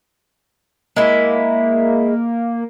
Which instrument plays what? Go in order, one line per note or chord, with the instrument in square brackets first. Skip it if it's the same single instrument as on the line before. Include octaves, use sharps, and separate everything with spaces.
[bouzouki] G#3 E4 [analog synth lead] A#3